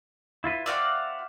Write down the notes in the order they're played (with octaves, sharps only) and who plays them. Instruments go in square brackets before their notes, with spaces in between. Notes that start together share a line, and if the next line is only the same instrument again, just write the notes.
[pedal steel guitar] E4 F4 B4
[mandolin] C4 F#4 D5 [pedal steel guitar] E5 F5 D6